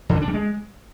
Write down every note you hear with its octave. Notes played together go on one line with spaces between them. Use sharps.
D3
C#4
D4
G3
G#3